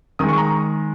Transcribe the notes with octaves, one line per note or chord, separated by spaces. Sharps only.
D#3 G#3 D#6
C#6
A#5